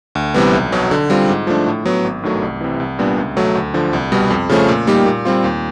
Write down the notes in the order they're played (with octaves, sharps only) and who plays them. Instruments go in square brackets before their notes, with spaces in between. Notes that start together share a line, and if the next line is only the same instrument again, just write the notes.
[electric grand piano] D2
C3 E3 G3 B3
B1
B2 F#3
D3
G3 C4 F4
G#2
F3 A3 D4
A2
F#3 B3
G#1
G2 D#3 F#3 A3
C2
C3 E3
C2
A#2 G3 B3 D4
C#2
B2 F#3 A3
D2
D3 F3
C2
B2 G3 B3
F2
C#3 F3 A3 C#4
A#2
G3 A#3 D#4 G4
A#2
G3 C4 F4
D#2